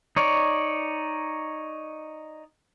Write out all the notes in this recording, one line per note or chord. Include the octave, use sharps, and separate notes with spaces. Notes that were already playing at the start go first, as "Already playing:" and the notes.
D#4 C#5 D5